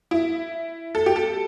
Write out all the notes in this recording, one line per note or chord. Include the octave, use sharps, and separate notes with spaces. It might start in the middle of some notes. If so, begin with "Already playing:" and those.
E4
A4
G4
A4